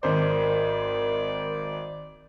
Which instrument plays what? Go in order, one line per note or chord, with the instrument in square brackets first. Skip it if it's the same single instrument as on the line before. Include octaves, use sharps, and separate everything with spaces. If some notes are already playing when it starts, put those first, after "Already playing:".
[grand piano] G#1 C5 [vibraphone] A#4 [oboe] D5